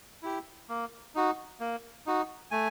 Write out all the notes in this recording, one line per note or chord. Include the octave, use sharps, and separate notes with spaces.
E4 G4
A#3
D#4 F#4
A#3
D#4 F#4
A3 G#5